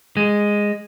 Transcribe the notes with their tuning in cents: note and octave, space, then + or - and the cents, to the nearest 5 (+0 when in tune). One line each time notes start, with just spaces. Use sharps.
G#3 -10